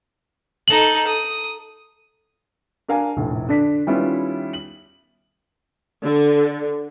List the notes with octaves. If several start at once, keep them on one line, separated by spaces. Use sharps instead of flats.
D#4 A4 F#7
D#6
D4 A#4 F5 G#5
F1 A#1 A2
D3 D4 D5 B6
D#3 G3 B3 C#4 E4 F4
F#7
D3